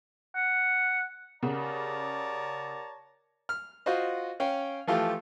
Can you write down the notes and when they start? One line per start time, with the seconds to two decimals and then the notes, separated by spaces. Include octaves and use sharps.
0.35 F#5
1.43 C#3 G4 A#4 C#5 D5 F#5 A5 A#5
3.49 F6
3.86 F4 F#4 C5 D#5
4.40 C#4 F5 G5
4.87 E3 F3 A3 F4 G4